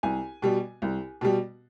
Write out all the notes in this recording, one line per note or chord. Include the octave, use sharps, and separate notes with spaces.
C2 G#5
B2 G3
C2
B2 G3